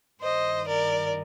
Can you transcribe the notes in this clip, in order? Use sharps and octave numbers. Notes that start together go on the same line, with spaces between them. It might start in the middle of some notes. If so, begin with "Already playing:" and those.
G2 D#3 C5 D#5
A#4 D5